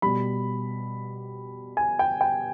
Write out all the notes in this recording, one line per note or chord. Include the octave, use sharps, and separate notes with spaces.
B2 G3 B5
G#5
G5
G5